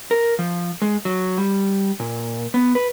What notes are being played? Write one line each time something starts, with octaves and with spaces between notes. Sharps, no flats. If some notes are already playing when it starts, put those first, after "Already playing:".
A#4
F3
G#3
F#3
G3
A#2
B3
B4